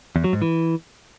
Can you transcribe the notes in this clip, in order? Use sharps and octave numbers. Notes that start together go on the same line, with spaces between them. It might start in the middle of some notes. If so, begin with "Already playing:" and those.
E2
F#3
G#2
E3